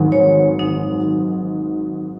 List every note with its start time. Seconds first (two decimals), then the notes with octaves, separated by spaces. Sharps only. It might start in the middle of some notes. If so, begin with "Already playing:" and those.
Already playing: G#1 G#2 F#3
0.12 C#5
0.59 D#4